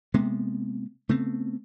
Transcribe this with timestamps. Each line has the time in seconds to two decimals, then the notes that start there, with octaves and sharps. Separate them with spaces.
0.14 C3 G#3 A#3 B3
1.09 C#3 A3 B3 C4